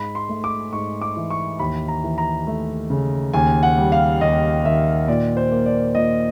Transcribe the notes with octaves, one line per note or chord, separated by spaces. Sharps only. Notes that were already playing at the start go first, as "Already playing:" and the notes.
Already playing: G#2 B5
C6
A3
D6
G#2 C#6
D6
E3
C#6
D#2 B5
A#5
E3
A#5
A3
C#3
D#2 G#5
F#5
G3
F5
D#2 D#5
D#3 E5
A#2 D5
C5
A#3
D5
A#2 D#5